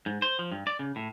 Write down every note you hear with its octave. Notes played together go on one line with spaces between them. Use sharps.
G#2
C5
F3
G2
D5
C#3
A2